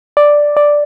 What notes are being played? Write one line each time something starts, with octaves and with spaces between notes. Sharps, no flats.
D5
D5